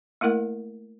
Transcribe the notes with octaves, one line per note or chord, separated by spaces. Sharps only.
A3 A#3 E4 A#4 F#5